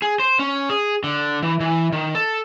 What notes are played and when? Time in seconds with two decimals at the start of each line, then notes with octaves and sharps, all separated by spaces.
0.02 G#4
0.20 C5
0.39 C#4
0.69 G#4
1.04 D3
1.42 E3
1.60 E3
1.92 D#3
2.15 A4